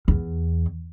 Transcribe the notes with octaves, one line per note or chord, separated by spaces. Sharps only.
E2